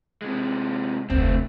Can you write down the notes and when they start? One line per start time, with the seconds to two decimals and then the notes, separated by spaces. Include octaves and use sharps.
0.22 C3 G#3
1.10 F1 D2 A3 C4